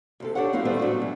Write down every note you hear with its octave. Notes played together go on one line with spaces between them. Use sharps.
D2 C3 A4
D4 E4 G4 A4 C#5 F#5
F#3 C4 C#4 E4 F5
D#3 G3 A3 B3 C4
A2 F#3 A3 D4 F#4 D5
B2 E3